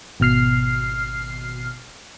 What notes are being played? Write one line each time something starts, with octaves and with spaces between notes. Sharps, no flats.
G#1 B2 F6 C7